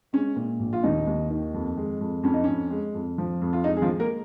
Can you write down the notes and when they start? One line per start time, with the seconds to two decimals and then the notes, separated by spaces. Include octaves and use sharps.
0.13 G#3 C#4
0.36 A#2
0.60 A#1
0.73 F4
0.83 D#2 D#4
1.07 D#2
1.30 D#3
1.54 F2
1.77 G#3
2.01 F2
2.23 F2 C#4
2.34 D#4
2.44 F2 C#4
2.70 G#3
2.94 F2
3.18 F3
3.41 F2
3.53 F4
3.64 G#3 D#4
3.77 G#4
3.82 F3 F4
3.89 G#3
4.00 A#3 A#4